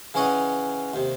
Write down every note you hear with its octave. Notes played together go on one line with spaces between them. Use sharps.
C#3 E3 C#4 C#5 D#5 F#5
D#2 C3